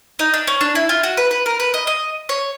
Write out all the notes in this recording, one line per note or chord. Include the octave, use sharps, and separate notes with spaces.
D#4
D4
C#4
D4
E4
F4
F#4
B4
B4
A#4
B4
D#5
D#5
C#5